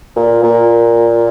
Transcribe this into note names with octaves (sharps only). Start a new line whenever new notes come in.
A#2
A#2